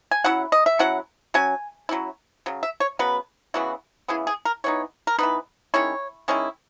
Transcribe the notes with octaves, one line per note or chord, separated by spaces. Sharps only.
G#5
F#3 C#4 E4 F#5
D#5
E5
F#3 C#4 E4 F#5
F#3 C#4 G#5
F#3 C#4 E4
C#3 F#3
E5
C#5
C#3 F#3 B3 B4
C#3 E3 B3 E4 F#4
C#3 E3 B3 E4 G#4
G#4
A#4
E3 B3 D#4 C#5
A#4
E3 B3 D#4 B4
D#3 G#3 C#4 E4 C#5
D#3 G#3 C#4 E4